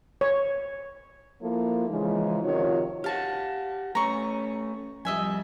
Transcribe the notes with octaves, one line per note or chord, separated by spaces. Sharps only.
C#5
F3 A#3 E4 F4 A4
C#3 E3 F3 G#3 D#4
C3 D#3 F3 F4 F#4 C#5
G4 F5 F#5 A5
A3 C#4 A#5 C#6
F2 G3 D#5 E5 G#5